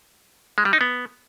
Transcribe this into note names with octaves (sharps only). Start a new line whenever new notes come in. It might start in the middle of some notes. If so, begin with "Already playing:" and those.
G#3
G3
D#4
B3